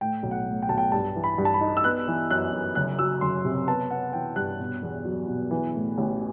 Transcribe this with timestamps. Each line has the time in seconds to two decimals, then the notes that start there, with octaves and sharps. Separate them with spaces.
0.01 A2 G5
0.23 B1
0.31 F#5
0.47 A2
0.62 G5
0.69 B1 A5
0.78 G5
0.92 G2 A5
1.16 E3
1.24 B5
1.38 G2
1.45 A5
1.54 B5
1.61 D#4
1.77 E6
1.84 B3 F#6
2.08 E3
2.31 F#2 F#6
2.53 F#2
2.75 F#1 F#6
2.99 F#3 E6
3.21 F#1 C6
3.45 C3
3.67 B3 A5
3.91 B3 F#5
4.13 E3 G5
4.36 G2 F#6
4.60 B2
4.83 E2
5.05 F#3
5.28 B2
5.51 E3
5.75 A2
5.98 A1